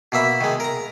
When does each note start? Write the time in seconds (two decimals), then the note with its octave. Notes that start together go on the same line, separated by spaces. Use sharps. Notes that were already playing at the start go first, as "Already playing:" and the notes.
0.12 B2 A#3 E5 B5
0.41 D#3 G#3
0.60 A#4 A#5